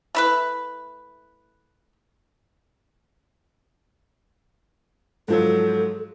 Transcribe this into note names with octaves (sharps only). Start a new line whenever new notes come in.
A3 E4 B4
G#2 F3 F#3 A4